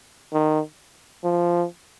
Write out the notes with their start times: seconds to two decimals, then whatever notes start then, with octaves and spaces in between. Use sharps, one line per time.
0.33 D#3
1.24 F3